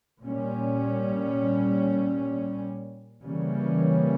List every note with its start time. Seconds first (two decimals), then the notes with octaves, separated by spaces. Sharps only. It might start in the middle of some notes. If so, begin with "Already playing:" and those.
0.22 A#2 G3 C#4
3.23 C#3 E3 G3 A#3 C#4